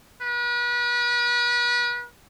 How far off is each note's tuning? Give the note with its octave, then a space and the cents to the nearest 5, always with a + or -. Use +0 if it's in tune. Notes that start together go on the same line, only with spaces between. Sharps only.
B4 -35